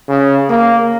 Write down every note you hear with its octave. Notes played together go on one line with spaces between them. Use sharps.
C#3
A#3